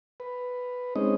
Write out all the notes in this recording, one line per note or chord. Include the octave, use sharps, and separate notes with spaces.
B4
G#3 C4 C#4 D#4 D#5